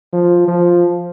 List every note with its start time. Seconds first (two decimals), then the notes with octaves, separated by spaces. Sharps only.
0.13 F3
0.48 F3